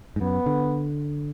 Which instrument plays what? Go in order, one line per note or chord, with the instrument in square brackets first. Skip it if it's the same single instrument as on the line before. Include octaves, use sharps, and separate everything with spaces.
[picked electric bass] G#2
[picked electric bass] F#2 [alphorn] B3
[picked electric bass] D3